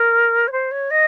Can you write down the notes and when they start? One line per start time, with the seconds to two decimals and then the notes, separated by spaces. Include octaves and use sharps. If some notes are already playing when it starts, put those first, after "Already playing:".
Already playing: A#4
0.47 C#5
0.52 C5
0.71 C#5
0.90 D#5